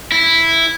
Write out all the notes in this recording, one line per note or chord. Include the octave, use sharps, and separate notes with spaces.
E4